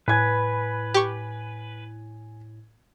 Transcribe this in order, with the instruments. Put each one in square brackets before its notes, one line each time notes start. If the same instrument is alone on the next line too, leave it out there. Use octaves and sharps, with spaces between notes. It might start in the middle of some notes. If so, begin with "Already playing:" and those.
[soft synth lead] A2 [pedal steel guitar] B4 [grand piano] G#5 G#6
[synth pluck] G4 C#6